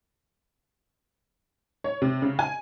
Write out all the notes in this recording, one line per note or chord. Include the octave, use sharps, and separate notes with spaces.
C#5
C3
C#3
G#5